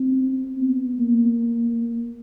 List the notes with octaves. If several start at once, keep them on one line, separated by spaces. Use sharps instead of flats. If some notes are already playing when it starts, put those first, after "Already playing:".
Already playing: C4
B3
A#3